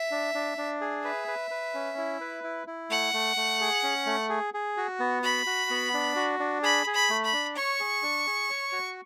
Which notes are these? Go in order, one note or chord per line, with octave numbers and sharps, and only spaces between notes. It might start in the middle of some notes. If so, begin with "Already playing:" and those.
Already playing: E5
D4
D4
D4
G#4
B4 E5
B4
B4
C#4
E4
B4
E4
E4
A3 F#5
A3
A3
G#4
C#4
A3
G#4
G#4
F#4
B3
F#4 B5
F#4
B3
D4
F#4
D4
G#4 B5
G#4
B5
A3
B5
D4
C#5 C#6
G#4
D4
G#4
C#5
F#4